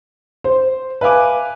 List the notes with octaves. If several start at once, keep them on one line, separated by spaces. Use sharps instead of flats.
C5
B4 E5 F5 G#5 D6